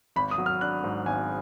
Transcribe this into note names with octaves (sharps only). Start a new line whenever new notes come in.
G#1 B5
D#6
F#3
F6
D4 F#6
G#2
G#1 G#5